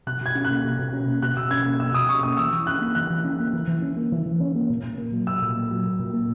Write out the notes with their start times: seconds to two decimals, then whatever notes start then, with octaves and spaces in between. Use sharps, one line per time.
0.06 B2 F#6
0.21 B2 G#6
0.35 C#4
0.45 F#6
0.50 A#3
0.64 B2
0.79 B2
0.93 C#4
1.08 A#3
1.22 B2 F#6
1.37 B2 E6
1.51 C#4 G#6
1.66 A#3
1.80 B2 E6
1.94 B2 D#6
2.09 C#4 C#6
2.23 A#3 D#6
2.37 E3 E6
2.53 E3
2.67 C#4 F#6
2.81 A#3
2.95 E3 F#6
3.10 E3
3.24 C#4
3.40 A#3
3.53 E3
3.67 E3
3.82 C#4
3.96 A#3
4.12 E3
4.25 E3
4.40 C#4
4.55 A#3
4.70 A#2
4.83 A#2
4.98 A#3
5.12 F#3
5.27 A#2 E6
5.42 A#2
5.56 A#3
5.71 F#3
5.85 A#2
5.99 A#2
6.13 A#3